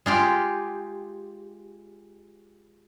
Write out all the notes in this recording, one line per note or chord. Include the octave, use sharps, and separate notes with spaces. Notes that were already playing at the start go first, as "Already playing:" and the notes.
G#3 F4 G4